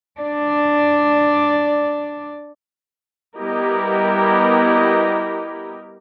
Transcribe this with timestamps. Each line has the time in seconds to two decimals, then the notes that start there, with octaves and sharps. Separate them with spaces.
0.21 D4 D5
3.38 G3 B3 E4 G4 A#4 D#5